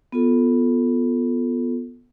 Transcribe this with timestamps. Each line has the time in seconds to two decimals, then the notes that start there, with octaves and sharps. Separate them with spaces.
0.12 B3 F4 A4